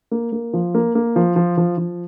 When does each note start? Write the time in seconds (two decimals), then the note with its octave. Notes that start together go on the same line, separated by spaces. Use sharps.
0.11 A#3
0.32 A#3
0.53 F3
0.74 A#3
0.95 A#3
1.16 F3
1.36 F3
1.57 F3
1.78 F3